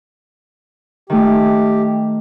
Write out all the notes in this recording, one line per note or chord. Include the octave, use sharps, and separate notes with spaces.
D#3 A3 G4